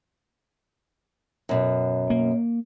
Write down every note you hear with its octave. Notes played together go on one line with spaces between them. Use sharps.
F#2 B2
A#3